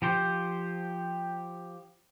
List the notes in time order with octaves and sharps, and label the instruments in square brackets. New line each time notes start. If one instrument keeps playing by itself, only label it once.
[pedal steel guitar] F3 G4 C5